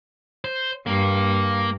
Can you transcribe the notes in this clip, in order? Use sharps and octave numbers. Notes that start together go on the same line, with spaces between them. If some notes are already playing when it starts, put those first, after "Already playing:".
C5
G2 A#3